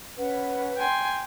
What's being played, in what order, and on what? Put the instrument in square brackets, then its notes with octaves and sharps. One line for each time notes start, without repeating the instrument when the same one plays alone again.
[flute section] C#4 B4 F#5
[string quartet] G5 G#5 C6